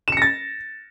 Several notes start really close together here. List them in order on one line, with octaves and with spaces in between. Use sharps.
E7 C#7 A#6 A6